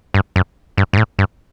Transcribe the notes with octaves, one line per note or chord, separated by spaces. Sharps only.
G2
F#2
G2
G2
A2
G2